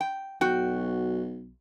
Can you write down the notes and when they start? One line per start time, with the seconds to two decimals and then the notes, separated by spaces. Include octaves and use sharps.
0.01 G5
0.41 B1 F#4 G5